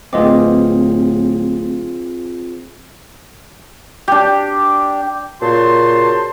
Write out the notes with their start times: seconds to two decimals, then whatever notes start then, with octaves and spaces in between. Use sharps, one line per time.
0.13 D1 C4 F4 G#4 B4 D#5 D6
4.08 D4 G4
5.41 A#2 C#3 F#4 C5 A5 C6